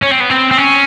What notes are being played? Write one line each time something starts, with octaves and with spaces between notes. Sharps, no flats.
C#4
C4
B3
C4
C4
C#4